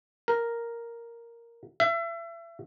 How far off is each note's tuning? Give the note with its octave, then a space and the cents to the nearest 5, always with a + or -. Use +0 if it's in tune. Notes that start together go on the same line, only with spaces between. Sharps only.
A#4 +0
E5 +35